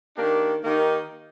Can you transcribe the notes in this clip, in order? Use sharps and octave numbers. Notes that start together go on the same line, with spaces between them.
D#3 A#3 D4 G4
D#3 A#3 D#4 G4